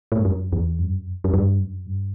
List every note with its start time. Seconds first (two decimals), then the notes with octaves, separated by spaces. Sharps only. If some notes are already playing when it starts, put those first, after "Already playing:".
0.12 A2
0.19 G2
0.25 F#2
0.52 E2
0.79 F#2
0.86 G2
0.93 F#2
1.24 F#2
1.33 G2
1.60 F#2
1.87 G2